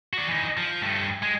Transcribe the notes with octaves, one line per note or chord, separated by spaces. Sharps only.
F#4 D5
E3 D#4
F3
G2 A3
G#3